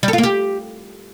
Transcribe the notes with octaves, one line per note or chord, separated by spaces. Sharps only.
G3
A4
F4
A#3
G4